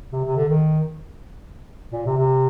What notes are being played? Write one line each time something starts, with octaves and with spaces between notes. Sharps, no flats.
C3
C3
D3
D#3
A#2
C3
C3